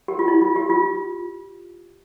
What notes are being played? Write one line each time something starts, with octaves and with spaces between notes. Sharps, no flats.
G4
F4
E4
F4
G4
F4